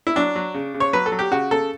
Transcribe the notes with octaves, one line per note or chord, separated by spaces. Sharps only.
E4
F#3 D4
F#3
C#3
C#3
C#5
F#3 B4
A4
F#3
G4
C#3 F#4
C#3 A4